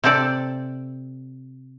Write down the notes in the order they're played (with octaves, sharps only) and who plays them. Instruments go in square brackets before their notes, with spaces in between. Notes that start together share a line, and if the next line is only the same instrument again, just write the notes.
[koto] C3 C4 G4 A4 D5